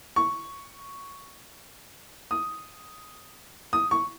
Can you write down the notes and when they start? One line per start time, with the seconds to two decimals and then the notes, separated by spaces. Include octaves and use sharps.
0.16 C#6
2.31 D#6
3.73 D#6
3.91 C#6